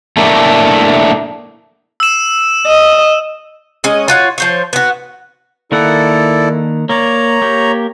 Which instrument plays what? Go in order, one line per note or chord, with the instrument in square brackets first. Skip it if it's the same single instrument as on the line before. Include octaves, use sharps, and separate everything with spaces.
[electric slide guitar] A3 A#3 D4 E4
[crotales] E6 E7
[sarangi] D#5
[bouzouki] G#3 C#4 D#5
F4 F#4 C#5
F3 C5 C#5
B3 F#4
[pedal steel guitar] D#3 A#3 F#5 [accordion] E4 A4 D5
[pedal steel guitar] A#3 D5 [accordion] C#5 A#5
[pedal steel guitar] A#3 G4